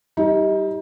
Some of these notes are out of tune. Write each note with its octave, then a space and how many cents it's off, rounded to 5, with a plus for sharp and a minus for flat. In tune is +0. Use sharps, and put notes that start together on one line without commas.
G3 +0 D#4 +35